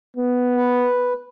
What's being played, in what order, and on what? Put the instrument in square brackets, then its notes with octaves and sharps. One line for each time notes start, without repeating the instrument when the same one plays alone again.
[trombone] B3
[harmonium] B4